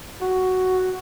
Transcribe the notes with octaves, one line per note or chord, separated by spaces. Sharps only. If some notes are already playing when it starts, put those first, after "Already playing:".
F#4